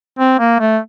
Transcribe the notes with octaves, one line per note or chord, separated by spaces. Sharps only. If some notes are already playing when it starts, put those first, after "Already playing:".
C4
A#3
A3